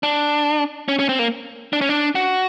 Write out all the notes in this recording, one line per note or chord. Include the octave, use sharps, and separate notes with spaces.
D4
C#4
C#4
C4
A#3
D4
C#4
D4
F#4